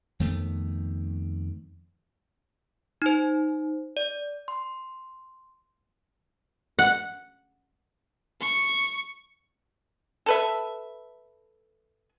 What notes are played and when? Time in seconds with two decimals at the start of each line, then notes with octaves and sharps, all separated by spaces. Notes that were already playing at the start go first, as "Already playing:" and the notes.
0.20 F2 D#3 A3 B3
3.02 D#4 C5
3.97 D5
4.48 C6
6.79 F#5
8.40 C#6
10.26 A4 B4 E5